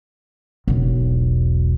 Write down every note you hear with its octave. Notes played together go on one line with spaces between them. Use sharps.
E1 B1